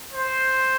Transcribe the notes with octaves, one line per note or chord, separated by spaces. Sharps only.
C5